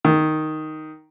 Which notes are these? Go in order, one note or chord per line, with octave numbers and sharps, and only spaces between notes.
D#3